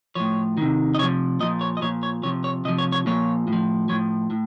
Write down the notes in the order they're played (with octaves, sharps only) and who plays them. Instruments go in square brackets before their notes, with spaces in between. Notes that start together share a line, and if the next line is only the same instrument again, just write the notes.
[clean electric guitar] A2 F3 C#5
C3 D#3
D#5
C3 C#5
F3
A#2 F3 D#5
C#5
D#5
A#2 F3 C#5
C#5
C3 F3 C#5
C#5
C3 D#5
F3
C#5
C#5
A#2 F3 C#5
A2
F3
A2 F3 C#5
A2